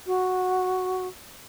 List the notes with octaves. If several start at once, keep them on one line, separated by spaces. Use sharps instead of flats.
F#4